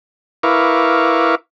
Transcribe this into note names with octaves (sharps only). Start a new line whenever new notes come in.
E4 A#4 B4 F5 C#6 D6